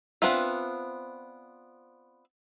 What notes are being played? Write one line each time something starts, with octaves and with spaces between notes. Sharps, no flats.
B3 C4 D4 F4 E5